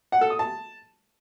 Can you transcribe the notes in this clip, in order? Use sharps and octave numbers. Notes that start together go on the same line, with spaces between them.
F#5
A4
D#6
A5